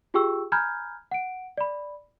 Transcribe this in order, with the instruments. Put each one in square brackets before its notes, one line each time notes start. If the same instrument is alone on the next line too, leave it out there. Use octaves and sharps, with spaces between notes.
[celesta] F4 G4 G#4 G5 C#6 E6
G#5 A#5 B5 F6 G6 G#6
F#5 D7
D5 B5